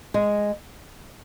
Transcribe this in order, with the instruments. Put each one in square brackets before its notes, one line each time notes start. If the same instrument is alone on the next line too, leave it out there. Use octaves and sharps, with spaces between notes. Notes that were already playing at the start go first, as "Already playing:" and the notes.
[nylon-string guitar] G#3